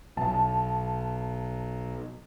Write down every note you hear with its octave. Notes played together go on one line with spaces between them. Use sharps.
B1 A5